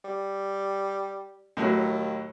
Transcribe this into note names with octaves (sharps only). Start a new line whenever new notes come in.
G3
D#2 A2 F#3